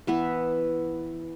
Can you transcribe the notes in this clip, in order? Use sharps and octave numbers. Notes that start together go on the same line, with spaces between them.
E3 B3 B4 E5